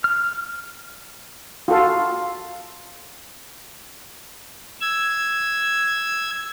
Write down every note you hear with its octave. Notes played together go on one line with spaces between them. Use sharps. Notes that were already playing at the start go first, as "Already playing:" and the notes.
F6
F4 F#4 A4 F5
E6 G#6